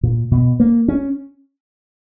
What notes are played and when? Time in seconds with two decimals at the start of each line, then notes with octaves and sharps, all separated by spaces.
0.03 A#2
0.31 B2
0.60 A#3
0.88 C#4